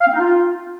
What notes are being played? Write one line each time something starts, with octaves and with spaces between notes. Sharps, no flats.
F5
C4
D#4
F4